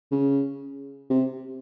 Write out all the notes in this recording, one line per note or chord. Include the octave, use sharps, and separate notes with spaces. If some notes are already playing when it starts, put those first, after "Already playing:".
C#3
C3